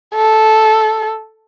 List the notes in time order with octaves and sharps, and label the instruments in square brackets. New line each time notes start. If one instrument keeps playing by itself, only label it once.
[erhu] A4